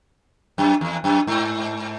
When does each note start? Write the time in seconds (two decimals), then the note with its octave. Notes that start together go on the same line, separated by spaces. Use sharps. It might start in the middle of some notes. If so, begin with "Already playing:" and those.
0.58 F#2
0.81 E2
1.04 F#2
1.27 G#2